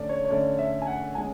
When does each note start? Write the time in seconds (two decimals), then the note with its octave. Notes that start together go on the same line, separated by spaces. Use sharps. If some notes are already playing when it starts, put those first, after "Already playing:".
Already playing: D3 A3 C#4 D5
0.09 C#5
0.25 C#5
0.30 D3 A3 C#4 D5
0.59 E5
0.82 G#5
0.87 F#5
1.15 G#3 C#4 G#5